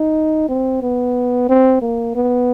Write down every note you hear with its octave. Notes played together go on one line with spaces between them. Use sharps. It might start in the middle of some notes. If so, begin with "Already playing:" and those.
Already playing: D#4
C4
B3
C4
A#3
B3